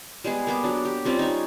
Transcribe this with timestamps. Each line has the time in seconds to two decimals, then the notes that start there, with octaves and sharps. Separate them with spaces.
0.24 G3 G#3 B3 G#4
0.47 A#3 B3 D6
0.64 F#3 D4
0.85 G4
1.05 G3 C4 C#4 F4
1.19 D#4 C#5